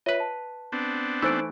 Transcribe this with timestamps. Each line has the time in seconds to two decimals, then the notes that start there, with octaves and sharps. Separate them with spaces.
0.06 F4 B4 C#5 D#5 E5
0.20 A5
0.72 B3 C4 D4
1.22 E3 A3 D#4 A4 C5 D7